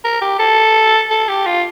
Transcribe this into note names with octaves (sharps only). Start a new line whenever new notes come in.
A#4
G4
A4
A4
G4
F4